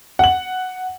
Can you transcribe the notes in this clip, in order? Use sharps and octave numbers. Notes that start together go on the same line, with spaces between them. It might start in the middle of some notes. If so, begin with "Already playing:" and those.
F#5 F#7